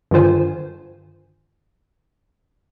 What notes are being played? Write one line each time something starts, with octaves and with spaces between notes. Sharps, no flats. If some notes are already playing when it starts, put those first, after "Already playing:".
G2 D3 D#3 F4 C5 G#5